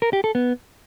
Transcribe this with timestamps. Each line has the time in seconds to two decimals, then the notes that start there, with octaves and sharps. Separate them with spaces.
0.02 A#4
0.13 G4
0.24 A4
0.35 B3